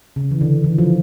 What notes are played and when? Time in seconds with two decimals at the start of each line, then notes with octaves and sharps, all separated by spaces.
0.16 C#3
0.31 E3
0.41 D3
0.64 E3
0.78 F3